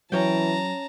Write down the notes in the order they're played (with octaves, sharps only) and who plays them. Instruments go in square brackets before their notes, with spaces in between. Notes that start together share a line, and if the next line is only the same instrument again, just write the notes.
[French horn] E3 [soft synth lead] F#3 [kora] C#4 G5 [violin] A5 A#5